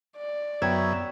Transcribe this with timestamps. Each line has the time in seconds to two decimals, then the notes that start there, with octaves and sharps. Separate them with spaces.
0.17 D5
0.62 F#2 B3 C#5 E5 G5 A#5 G#6